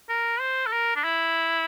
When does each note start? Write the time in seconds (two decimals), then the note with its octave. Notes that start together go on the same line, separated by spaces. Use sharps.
0.09 A#4
0.40 C5
0.66 A4
0.73 A#4
0.96 D4
1.04 E4